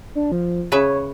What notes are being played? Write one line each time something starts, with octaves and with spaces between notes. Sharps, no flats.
D4
F3
C#3 B4 C#5 E5